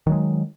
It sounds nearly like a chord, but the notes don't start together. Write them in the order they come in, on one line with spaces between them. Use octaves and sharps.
D#3 F#3 G#3